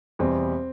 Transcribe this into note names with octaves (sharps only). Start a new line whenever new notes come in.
E2 B2 G3 C4